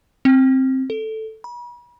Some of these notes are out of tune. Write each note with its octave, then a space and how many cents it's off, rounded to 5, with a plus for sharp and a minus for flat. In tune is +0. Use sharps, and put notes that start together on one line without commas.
C4 +10
A4 +0
B5 -40